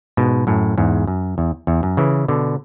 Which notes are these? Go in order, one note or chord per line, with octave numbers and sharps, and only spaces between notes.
G#2 B2
F#2 A2
E2 G#2
F#2
E2
E2
F#2
C#3 E3
B2 D3